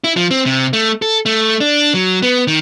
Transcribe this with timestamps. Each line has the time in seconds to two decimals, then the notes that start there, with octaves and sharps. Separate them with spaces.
0.04 E4
0.17 F3
0.31 C4
0.46 C3
0.73 A3
1.02 A4
1.26 A3
1.61 D4
1.94 F#3
2.23 B3
2.47 D#3